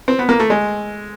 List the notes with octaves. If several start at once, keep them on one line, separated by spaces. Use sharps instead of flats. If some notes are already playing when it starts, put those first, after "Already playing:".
C4
B3
A#3
A3
G#3